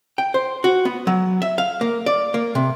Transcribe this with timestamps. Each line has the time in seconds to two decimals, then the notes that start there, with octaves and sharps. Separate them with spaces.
0.18 G5
0.34 C5
0.64 F#4
0.85 B3
1.07 F#3
1.42 E5
1.58 F5
1.81 A#3
2.06 D5
2.34 A#3
2.55 C3